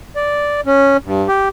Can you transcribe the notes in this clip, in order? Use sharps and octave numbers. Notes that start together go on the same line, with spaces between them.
D5
C#4
G2
G4